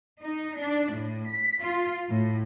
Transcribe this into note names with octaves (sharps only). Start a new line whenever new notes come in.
D#4
D4
A2
B6
F4
A2